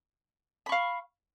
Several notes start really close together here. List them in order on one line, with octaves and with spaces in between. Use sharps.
B5 C#6 F5